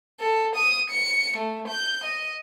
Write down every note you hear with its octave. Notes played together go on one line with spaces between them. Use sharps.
A4
D#6
C#7
A3
G6
D#5